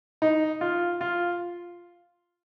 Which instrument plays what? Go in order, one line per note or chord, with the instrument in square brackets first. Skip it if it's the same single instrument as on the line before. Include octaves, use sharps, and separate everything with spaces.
[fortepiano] D#4
F4
F4